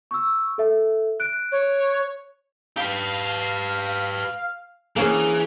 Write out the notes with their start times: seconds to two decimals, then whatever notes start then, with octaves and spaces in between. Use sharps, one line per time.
0.11 C#6 E6
0.58 A4 E5
1.20 F#6 D7
1.52 C#5
2.77 G4 B4 F5
4.96 E3 A#3 C#4 G#4